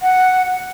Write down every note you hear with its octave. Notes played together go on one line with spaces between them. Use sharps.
F#5